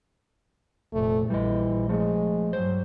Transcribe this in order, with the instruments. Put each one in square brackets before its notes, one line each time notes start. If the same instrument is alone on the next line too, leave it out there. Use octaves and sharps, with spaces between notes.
[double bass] F1 A#2 [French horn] A3
[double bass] A#1 [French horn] E3 [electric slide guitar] G3 D#5
[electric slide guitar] F3 A3 [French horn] G#3
[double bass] G2 F#3 [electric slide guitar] C5